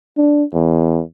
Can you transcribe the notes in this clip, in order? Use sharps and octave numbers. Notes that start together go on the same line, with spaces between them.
D4
E2